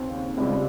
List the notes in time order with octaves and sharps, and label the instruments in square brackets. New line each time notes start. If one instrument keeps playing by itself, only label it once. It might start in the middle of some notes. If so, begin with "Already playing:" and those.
Already playing: [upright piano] D#2 C#3 C4
C#2 C3 G3